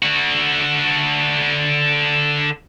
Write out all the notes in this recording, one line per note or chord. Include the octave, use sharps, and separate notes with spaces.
D3 F#4